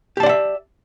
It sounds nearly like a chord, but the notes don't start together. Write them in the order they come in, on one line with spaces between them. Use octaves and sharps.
G4 A5 D5 F#5 E5